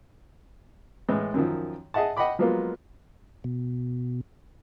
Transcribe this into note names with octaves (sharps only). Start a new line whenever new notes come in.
A2 E3 G#3
F#2 D#3 F3
G#4 D#5 E5 F#5 A5
D#5 F#5 G5 B5 D6
F3 F#3 G#3 A#3 B3 F4
B2